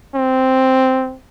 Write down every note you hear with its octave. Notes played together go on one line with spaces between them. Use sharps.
C4